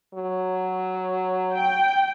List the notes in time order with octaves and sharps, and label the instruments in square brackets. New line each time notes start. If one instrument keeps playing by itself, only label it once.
[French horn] F#3
[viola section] G5